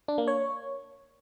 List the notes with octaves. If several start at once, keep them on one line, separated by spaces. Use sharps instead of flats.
D4
A#3
C#5